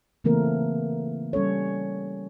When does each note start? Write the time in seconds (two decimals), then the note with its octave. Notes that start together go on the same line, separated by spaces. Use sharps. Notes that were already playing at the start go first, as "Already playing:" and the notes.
0.24 C#3 E3 A3 A#3 C4 A#4
1.33 G3 C#4 A4 C#5